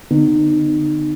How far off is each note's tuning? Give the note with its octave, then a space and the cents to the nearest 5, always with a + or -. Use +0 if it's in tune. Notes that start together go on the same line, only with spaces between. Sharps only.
D3 +0 B3 +30 D#4 -30